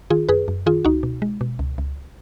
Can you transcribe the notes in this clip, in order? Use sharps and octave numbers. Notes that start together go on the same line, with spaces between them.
D#3 F4 G#4
F#2 G#4 B4
F#2
D#3 F4 G#4
C#2 D#4 F#4
B2
G#3
B2
C#2
C#2